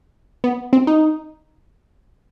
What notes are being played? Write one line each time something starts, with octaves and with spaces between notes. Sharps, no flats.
B3
C4
D#4